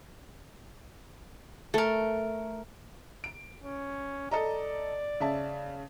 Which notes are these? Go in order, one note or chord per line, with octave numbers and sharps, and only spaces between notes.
A3 A4 A#4
D7
C#4
A4 D5 D#5 A#5
C#3 E5 A5